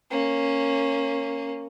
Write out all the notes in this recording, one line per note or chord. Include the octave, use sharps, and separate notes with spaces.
A#3 C#4